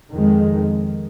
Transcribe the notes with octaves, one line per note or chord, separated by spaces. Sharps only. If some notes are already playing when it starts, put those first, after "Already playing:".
F2 D#3 G#3